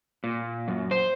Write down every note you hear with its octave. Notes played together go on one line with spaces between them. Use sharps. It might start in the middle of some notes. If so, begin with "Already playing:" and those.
A#2
F#2
C5